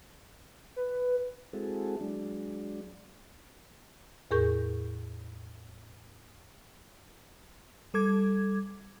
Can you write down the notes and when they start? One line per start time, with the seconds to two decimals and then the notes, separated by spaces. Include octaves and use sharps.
0.76 B4
1.53 G#3 C4 E4 F#4 G#4 A4
2.01 F#3 G#3 D4
4.31 E2 A2 G#4 A#4 C#6 G6
7.94 G3 A4 D6 G#6